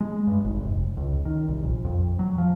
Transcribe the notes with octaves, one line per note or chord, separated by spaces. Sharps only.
G#3
G2
G#1
F1
C#2
D#3
C2
A#1
F2
F#3
F3